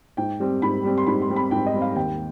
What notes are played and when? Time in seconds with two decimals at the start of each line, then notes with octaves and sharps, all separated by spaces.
0.17 G#2 G5
0.40 G3 C4
0.62 G#2 B5
0.84 G3 C4
0.98 C6
1.07 G#2 B5
1.22 C6
1.30 G3 C4
1.36 B5
1.51 G#2 G5
1.66 D#5
1.74 G3 C4
1.82 F5
1.96 D#2 G5